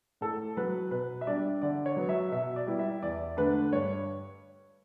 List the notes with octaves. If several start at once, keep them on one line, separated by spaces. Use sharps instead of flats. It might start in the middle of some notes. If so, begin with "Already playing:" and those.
A2 A4
F#3 B3 B4
B2 B4
E5
G3 D4 D5
D3 D5
C#5
F#3 B3
E5
B2 E5
D5
G3 B3 E4
E5
E2 D5
D3 A3 D4 B4
G2 C#5